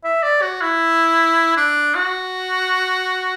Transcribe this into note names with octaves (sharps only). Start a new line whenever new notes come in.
E5
D5
F#4
E4
D4
F#4